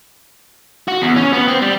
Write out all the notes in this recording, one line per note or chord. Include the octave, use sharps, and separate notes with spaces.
F#4
E2
C#4
B3
C4
G3